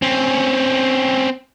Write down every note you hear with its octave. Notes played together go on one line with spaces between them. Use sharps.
C4 C#4